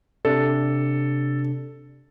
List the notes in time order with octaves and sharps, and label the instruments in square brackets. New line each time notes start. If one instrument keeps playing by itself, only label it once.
[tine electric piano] C3 D4 [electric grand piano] A4